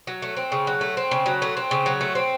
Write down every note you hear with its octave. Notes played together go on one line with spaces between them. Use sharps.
F#3
A3
C4
C#3
F#3
A3
C4
C#3
F#3
A3
C4
C#3
F#3
A3
C4